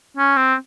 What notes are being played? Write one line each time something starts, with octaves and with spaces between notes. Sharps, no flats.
C#4
C4